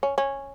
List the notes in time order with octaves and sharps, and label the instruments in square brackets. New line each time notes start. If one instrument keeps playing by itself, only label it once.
[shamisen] C#4
C#4